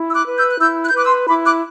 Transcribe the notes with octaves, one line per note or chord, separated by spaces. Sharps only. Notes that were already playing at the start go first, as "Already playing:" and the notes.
Already playing: E4
E6
D6 F#6
B4
E6 G6
F#6
E4 E6 G6
F#6
G6
B4 D6 F#6
C6 E6
E4 B5 D6
D6 F#6